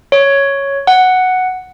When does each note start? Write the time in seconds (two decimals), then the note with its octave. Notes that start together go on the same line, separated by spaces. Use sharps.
0.12 C#5
0.87 F#5